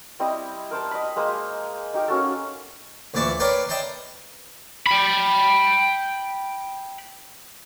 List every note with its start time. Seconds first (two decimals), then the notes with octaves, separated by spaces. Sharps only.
0.20 G3 C4 E4 D#5
0.71 A#4 C5 A5
0.91 D#5 B5
1.16 G#3 A#3 C5
1.94 D#4 G4 A#4
2.08 A#3 C#4 F#4 A4
3.14 D2 A#2 E3 D5 A5 C#6
3.40 A#4 B4 C#5 D5 G5 C6
3.69 D5 D#5 G5 A5 A#5 C6
4.87 G5 B5